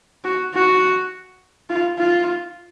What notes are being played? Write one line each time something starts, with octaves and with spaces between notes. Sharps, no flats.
F#4
F#4
F4
F4